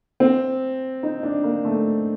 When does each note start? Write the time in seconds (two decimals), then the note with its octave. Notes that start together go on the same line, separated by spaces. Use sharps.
0.20 C4
1.03 D#4
1.23 D4
1.44 A#3
1.65 A3